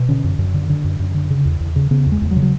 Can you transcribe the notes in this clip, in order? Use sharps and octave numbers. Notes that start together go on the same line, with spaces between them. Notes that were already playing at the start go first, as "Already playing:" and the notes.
Already playing: B2
D3 C#4
F#2
F#2
D3
D3
F#2
F#2
D3
C#3
E2
E2
C#3
C#3 B3
E2
G#3
E2
F#3
C#3
F#3